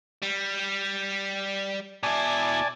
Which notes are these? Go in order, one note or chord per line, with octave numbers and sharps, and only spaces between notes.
G3
B2 E4 D5 G#5 A5